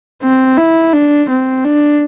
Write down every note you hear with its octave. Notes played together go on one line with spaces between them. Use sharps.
C4
E4
D4
C4
D4